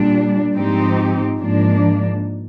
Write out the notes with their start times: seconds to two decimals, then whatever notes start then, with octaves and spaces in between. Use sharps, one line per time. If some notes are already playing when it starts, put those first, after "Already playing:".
Already playing: A#2 G3 D4
0.55 G#2 F3 C4 D#4 G4
1.38 G#2 F3 A#3 D4